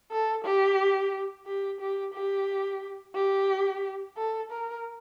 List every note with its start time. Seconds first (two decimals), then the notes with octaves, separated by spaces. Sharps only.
0.12 A4
0.44 G4
1.46 G4
1.80 G4
2.13 G4
3.15 G4
4.17 A4
4.51 A#4